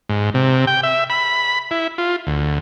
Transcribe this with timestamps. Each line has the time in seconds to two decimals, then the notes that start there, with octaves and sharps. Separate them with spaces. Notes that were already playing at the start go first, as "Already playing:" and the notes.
0.09 G#2
0.34 C3
0.67 G5
0.83 E5
1.10 B5
1.71 E4
1.98 F4
2.27 D2